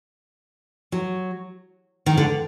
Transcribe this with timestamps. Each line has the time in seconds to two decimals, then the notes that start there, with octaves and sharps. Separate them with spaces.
0.92 F#3
2.06 D#3
2.17 D3